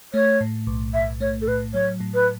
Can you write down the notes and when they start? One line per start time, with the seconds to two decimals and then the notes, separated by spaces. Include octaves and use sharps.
0.14 A3 C#5
0.41 A2
0.67 B1
0.94 B1 E5
1.20 A3 C#5
1.42 A4
1.48 A2 B4
1.74 F#3 C#5
2.00 A2
2.14 B4